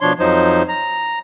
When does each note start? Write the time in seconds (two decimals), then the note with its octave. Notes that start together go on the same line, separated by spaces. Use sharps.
0.01 B2 F3 D4 C#5 C6
0.19 F2 F3 F#3 D#4 C5
0.68 A#5